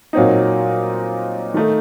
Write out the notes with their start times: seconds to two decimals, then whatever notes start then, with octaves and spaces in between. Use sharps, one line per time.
0.13 A#2 F#3 C4 D#4
1.54 D#3 A3 D#4